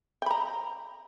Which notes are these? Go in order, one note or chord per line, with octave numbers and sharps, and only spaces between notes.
G5 A#5 B5